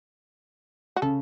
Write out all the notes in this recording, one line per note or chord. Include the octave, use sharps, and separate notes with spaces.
F#4
C#3 A4